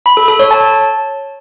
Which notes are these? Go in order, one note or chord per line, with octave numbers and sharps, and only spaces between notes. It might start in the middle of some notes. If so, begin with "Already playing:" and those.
B5
A4
A4
C#5
A5